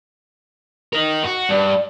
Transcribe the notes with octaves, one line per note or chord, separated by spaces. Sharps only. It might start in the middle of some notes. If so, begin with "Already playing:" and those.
A#4 D#5
F#4
G2 D5